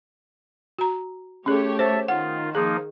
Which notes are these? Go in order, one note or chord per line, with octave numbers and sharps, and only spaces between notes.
F#4 A#5
A3 C#4 G4 G#4 C#5
C5 E5 A5
D#3 F4 F#5
F3 A#3 D#4 G#4